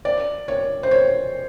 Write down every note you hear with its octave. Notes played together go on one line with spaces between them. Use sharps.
D5
C#5
C5
C#5